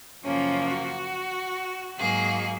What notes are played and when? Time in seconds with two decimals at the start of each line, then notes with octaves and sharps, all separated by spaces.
0.24 F#2 C#3 F3 A#3 C#4
0.68 F#4
1.99 G#2 F#3 A#3 G#4